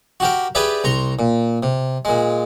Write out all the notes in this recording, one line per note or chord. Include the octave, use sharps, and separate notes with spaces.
F#4 G4 A#4
G4 G#4 B4 D5 E5
C2 A#5 C6 C#6
A#2
C3
A#2 G#3